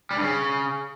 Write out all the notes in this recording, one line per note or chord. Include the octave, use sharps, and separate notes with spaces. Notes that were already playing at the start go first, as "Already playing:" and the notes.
G3
G2
C#3